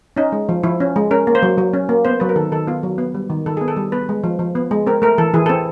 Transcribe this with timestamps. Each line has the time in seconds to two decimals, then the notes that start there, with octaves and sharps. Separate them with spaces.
0.17 C#4 D#4
0.32 G#3
0.49 F3
0.63 F3 E4
0.80 C#4
0.96 G#3
1.11 C#4 A#4
1.27 A#3
1.35 C5
1.43 F#3
1.58 F#3
1.73 C#4
1.89 A#3
2.05 B3 C5
2.20 F#3 B4
2.29 A#4
2.36 D#3 A4
2.52 D#3 A4
2.68 B3 F4
2.83 F#3
2.98 B3
3.14 G3
3.30 D#3
3.46 D#3 A4
3.57 B3 G#4
3.68 A4
3.77 G3
3.92 B3 B4
4.09 G#3
4.24 F3
4.39 F3
4.55 B3
4.71 G#3
4.87 C4 A#4
5.02 A3 A#4
5.18 E3 A4
5.34 E3 G#4
5.46 C4 A4